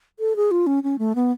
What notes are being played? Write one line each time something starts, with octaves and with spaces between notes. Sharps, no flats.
A4
G#4
F4
C#4
C#4
A3
B3